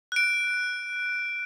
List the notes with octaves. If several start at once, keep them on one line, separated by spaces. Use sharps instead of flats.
F#6 D7